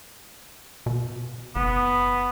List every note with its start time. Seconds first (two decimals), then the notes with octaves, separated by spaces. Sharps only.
0.86 B2
1.56 F#1 B3